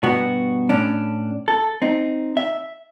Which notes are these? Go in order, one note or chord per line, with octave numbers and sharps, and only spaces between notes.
G2 B2 B3 F#4
A2 C#4 D4
A4
C4 D#4
E5